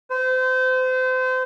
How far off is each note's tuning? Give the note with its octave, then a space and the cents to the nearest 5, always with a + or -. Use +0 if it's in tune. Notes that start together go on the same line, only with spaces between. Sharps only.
C5 -30